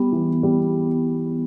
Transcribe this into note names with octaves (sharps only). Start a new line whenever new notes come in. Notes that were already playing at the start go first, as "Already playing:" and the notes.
Already playing: G3 B3 G4
E3
G3